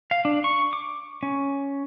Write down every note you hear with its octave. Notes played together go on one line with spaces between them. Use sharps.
F5
D4
C#6
D6
C#4